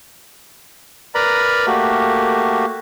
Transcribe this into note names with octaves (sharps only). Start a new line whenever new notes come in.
A#4 B4 D5 A#5 B5
A3 A#3 F#4 G4